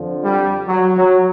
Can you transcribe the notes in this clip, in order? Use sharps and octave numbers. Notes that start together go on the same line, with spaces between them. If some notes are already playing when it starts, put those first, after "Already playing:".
Already playing: F2 D3 F3
G3
F#3
F#3